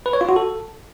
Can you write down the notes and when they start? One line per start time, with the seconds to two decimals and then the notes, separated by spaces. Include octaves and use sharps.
0.06 B4
0.13 C#5
0.21 F4
0.29 F#4
0.36 A4